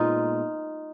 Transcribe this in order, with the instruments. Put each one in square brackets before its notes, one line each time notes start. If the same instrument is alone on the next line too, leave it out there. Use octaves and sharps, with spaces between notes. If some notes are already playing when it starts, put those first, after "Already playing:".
Already playing: [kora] A#2 G#3 B3 D#4 F4